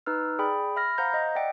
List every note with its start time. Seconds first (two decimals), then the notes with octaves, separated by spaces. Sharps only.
0.06 D#4 B4 E6 F6
0.39 G#4 D5 G5 B5
0.76 E5 B5 F6 A#6
0.98 C5 F5 F#5 A#5 G6 A#6
1.14 D#5
1.35 D5 E5 F#5 G5